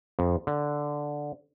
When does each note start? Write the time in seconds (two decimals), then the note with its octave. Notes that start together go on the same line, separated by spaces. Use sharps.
0.19 F2
0.47 D3